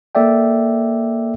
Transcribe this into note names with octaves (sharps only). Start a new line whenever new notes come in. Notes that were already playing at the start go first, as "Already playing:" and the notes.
A#3 A4 D5 E5 G5